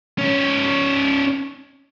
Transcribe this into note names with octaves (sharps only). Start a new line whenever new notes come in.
C#4 D#4